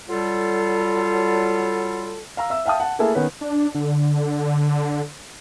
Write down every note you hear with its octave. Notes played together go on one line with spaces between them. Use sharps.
F#3 G3 F4 A4
F5 A#5 E6
E5 E6
E5 F5 G5 A5 D#6
F#5 A5
A3 A#3 E4 G#4 A4
D#3 B3 C#4 B4
D4
D3